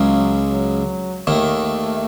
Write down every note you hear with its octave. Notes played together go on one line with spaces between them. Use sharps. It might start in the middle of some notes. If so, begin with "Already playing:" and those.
Already playing: C#2 C#3 F#3
F#3
D#2 D#3 A3